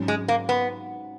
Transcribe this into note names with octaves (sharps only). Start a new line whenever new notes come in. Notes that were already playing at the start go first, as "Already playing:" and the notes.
Already playing: G#2 F#3 C#4
G#3
A#3
B3